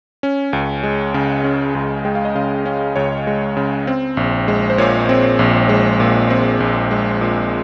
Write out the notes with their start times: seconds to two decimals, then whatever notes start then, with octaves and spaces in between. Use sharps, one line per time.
0.23 C#4
0.53 C#2
0.83 G#3
1.14 C#3
1.44 C#4
1.75 C#2
2.05 G#3 G5
2.15 F5
2.25 D#5
2.35 C#3 F5
2.66 C#4
2.96 C#2 C#5
3.27 G#3
3.57 C#3
3.87 C4
4.17 A#1
4.48 G#3
4.70 C5
4.78 A#2 C#5
5.09 C4
5.39 A#1
5.69 G#3
6.00 A#2
6.30 C4
6.60 A#1
6.91 G#3
7.21 A#2